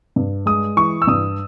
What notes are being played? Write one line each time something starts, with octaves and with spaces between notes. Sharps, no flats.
G2
G#3 D#6
E3 C#6
E6
G2 D#6